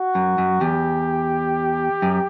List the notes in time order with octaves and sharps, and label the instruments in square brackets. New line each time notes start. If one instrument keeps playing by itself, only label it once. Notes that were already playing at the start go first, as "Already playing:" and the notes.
Already playing: [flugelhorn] F#4
[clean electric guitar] F#2
F#2
[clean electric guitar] E2 [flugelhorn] G4
[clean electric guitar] F#2